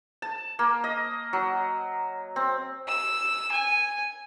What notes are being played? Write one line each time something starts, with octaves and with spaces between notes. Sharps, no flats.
A5
A#3
D#5
F#3
C4
E6
G#5